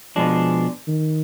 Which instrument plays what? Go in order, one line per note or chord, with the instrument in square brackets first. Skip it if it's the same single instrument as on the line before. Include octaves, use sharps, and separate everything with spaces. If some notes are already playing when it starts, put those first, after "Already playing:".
[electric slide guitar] B2 G#3 D4 [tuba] F3
[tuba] D#3